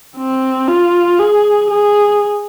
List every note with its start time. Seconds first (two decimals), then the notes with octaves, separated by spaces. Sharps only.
0.17 C4
0.68 F4
1.19 G#4
1.71 G#4